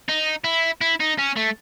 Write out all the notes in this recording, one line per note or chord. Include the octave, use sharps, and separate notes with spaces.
D#4
E4
E4
D#4
C#4
A3